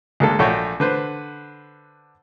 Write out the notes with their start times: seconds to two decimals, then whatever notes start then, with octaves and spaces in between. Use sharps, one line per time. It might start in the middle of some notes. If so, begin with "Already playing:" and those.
0.20 D2 G#3 A#3 D4 A4
0.39 A#1 A3 F#4 C#5 G5
0.80 D3 B4 C5